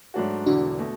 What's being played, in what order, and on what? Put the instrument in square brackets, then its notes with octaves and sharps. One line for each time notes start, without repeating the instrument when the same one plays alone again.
[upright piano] G#2 F#3 A3 D4 F#4
[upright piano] E1 E2 D3 [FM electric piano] D4 F#4
[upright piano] B2 A3